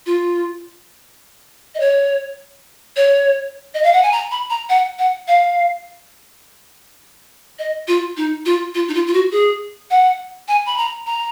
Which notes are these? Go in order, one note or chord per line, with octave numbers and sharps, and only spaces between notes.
F4
D#5
C#5
C#5
D#5
F5
F#5
G#5
A#5
B5
A#5
F#5
F#5
F5
D#5
F4
D#4
F4
F4
D#4
F4
F4
F#4
G#4
F#5
G#5
B5
A#5
A#5